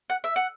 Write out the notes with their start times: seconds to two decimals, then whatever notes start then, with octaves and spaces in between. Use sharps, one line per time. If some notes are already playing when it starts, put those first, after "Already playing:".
0.10 F#5
0.24 E5
0.36 F#5